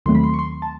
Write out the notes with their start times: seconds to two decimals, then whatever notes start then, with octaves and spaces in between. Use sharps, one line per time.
0.06 D#2 D#3 F#3 A3 C4 C6
0.15 B5
0.24 C6
0.34 C#6
0.39 C6
0.62 A5